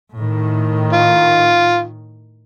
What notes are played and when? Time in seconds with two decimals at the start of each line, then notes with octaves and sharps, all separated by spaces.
0.17 A2 D#3
0.93 F4